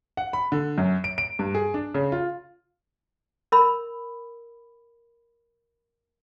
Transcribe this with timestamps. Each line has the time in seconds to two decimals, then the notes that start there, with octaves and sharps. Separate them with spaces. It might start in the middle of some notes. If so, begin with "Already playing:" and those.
0.17 F#5
0.33 B5
0.52 D3
0.78 F#2
1.04 D7
1.18 D7
1.39 G2
1.55 G#4
1.74 D4
1.94 C#3
2.12 F4
3.52 A#4 B5